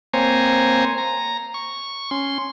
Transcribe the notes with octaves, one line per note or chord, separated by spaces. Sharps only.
A#3 C4 C5 C#5 G#5 A#5
A#5
C#6
C#4 C6